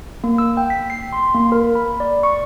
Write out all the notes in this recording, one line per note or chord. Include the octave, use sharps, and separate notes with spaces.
A#3
E6
G5
B6
C7
C6
A#3
A#4
B5
D5
C#6